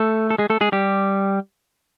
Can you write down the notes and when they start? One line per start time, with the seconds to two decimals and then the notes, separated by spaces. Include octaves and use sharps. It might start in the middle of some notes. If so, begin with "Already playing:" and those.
Already playing: A3 A4
0.30 A4
0.38 G#3 G#4
0.50 A3 A4
0.61 G#3 G#4
0.72 G3 G4